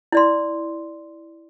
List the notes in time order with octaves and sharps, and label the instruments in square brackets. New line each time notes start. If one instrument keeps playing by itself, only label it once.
[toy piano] E4 D5 C6